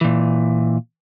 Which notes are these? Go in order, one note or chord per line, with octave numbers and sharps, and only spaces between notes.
A#2 E3